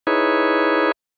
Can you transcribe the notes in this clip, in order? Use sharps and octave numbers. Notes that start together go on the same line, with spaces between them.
D#4 E4 G#4 B4 C#5